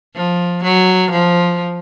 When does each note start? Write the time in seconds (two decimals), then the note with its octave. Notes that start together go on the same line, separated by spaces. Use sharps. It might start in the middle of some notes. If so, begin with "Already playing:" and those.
0.15 F3
0.63 F#3
1.10 F3